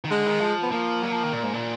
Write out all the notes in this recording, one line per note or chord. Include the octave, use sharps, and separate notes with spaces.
D#3
D3 G#3
D#3
F3
B3
F3 A#3
F#3
F3
D#3
A#2
G#2
A#2